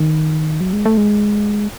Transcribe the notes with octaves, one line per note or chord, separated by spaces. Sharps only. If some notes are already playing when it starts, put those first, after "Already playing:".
Already playing: D#3
F#3
G#3
A3
G#3